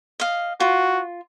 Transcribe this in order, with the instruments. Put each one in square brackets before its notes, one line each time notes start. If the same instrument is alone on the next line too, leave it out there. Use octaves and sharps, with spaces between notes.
[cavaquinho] D#5 F5
[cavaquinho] F4 [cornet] F#4